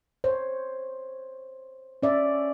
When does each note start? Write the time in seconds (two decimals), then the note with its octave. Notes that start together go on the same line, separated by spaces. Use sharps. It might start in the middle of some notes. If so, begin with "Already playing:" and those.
0.24 C5 C#5
2.03 C#4 D5 E5